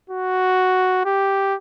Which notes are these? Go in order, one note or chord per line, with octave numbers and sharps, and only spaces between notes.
F#4
G4